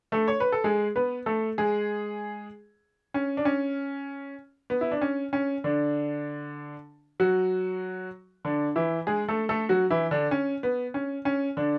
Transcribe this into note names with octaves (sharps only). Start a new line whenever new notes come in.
A3 A4
C#5
B4
A4
G#3 G#4
B3 B4
A3 A4
G#3 G#4
C#4
D4
C#4
B3
E4
D4
C#4
C#4
D3 D4
F#3 F#4
D3 D4
E3 E4
G#3 G#4
A3 A4
A3 A4
F#3 F#4
E3 E4
D3 D4
C#4
B3
C#4
C#4
D3 D4